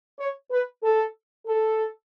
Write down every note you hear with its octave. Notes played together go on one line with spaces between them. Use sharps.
C#5
B4
A4
A4